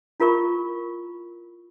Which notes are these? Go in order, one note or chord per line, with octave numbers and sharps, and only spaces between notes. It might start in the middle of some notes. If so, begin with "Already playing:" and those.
E4 F4 A#4 B5 C#6